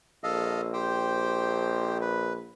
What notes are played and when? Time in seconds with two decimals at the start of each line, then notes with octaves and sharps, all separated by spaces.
0.24 A#1 A4 D#5 F5
0.73 G4 C5 G5
2.01 B4